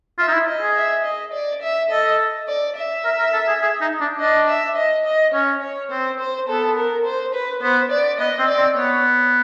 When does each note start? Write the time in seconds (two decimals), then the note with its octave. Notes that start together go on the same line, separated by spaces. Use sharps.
0.19 F4 E5
0.28 D#4
0.33 E4
0.47 D#5
0.62 G#4
0.77 E5
1.04 D#5
1.33 D5
1.62 E5
1.90 A4 D#5
2.48 D5
2.76 E5
3.05 A#4
3.19 A#4
3.33 A4
3.48 G#4
3.62 G#4
3.81 D#4
4.00 D4
4.19 D4 D#5
4.48 E5
4.76 D#5
5.05 D#5
5.33 C#4 C#5
5.62 C#5
5.91 C4 C5
6.19 C5
6.48 B3 A4
6.76 A#4
7.05 C5
7.34 B4
7.62 B3 C5
7.91 D5
8.19 B3 D#5
8.39 C4
8.48 D5
8.58 C4
8.76 B3 C#5